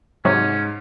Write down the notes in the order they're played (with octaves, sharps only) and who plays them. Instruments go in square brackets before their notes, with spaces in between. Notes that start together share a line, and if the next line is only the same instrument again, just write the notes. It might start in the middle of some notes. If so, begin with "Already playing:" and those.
[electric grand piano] G#2 [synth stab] C3 F#3 [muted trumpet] C#4